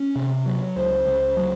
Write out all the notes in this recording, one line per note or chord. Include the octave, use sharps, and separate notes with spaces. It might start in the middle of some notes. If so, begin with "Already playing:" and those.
Already playing: C#4
C3
F#3
C#2 C5
C#2
F#3